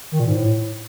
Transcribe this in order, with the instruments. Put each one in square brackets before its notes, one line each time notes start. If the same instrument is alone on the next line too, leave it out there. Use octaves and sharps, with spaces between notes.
[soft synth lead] D#3
A#2
G#2
A2